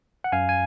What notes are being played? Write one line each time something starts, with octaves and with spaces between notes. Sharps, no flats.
F#5
F#2 F5 G#5
G#5